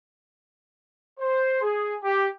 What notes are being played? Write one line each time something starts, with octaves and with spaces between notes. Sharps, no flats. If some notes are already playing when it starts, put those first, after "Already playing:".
C5
G#4
G4